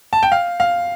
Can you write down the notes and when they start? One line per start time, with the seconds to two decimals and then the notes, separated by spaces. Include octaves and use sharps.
0.13 A5
0.23 G5
0.32 F5
0.60 F5